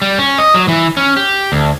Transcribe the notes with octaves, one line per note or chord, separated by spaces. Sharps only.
G3
C#4
D#5
F#3
E3
C#4
G4
D2